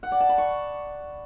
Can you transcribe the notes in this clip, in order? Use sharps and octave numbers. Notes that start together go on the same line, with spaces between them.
F#5
D5
A5
B5
C#6